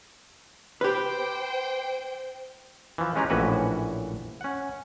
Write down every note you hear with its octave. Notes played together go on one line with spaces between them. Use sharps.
G4 B4 C5 G5
E3 F3
G#3 C#4 G4 B4 A#5
A#1 A2 E3 C#4 F#4 B4
C#4 F#5